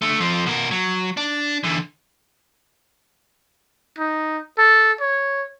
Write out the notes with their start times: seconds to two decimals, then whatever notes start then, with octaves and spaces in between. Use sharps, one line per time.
0.02 D3 A3
0.20 F3 C4
0.46 B2 A#4
0.71 F#3
1.17 D4
1.64 D3 E3
3.98 D#4
4.58 A4
5.00 C#5